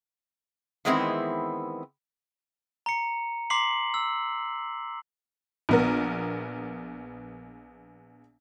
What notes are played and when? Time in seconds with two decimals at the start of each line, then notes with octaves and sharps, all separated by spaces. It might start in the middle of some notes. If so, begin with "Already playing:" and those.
0.85 D#3 E3 G#3 B3 C4 E4
2.86 A#5 C#7
3.50 A#5 C6 D6 B6 C7 F#7
3.94 E6
5.69 A#1 B3 A#4